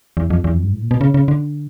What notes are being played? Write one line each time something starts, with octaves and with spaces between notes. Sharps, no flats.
E2
F2
E2
F2
G2
A2
A#2
B2
C#3
C#3
D3